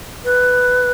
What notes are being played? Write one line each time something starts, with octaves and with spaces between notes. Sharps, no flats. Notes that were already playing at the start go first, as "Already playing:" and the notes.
B4